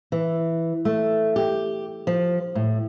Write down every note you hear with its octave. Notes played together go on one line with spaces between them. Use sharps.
E3
A3
G4
F3
A2